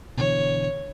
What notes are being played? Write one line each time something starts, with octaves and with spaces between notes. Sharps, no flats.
B2 D3 E3 C#5